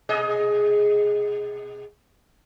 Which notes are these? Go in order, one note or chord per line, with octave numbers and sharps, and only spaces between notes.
B2 G#4 D#5